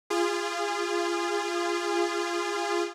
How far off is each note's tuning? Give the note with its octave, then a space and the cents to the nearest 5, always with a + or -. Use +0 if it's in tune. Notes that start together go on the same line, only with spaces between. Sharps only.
F4 -20 G#4 -25